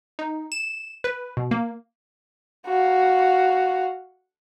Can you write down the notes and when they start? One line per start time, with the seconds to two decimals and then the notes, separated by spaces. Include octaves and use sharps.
0.19 D#4
0.52 E7
1.04 B4
1.37 B2
1.51 A#3
2.66 F#4 F5